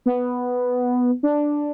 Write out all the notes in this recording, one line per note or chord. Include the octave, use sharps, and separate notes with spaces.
B3
D4